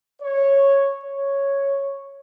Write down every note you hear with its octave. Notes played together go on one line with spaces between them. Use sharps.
C#5
C#5